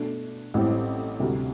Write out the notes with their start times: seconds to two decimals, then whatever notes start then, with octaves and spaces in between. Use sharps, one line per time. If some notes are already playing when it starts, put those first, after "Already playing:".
Already playing: B2 A3 D4
0.54 A1 A2 G3 C4 E4
1.20 D2 C3 G3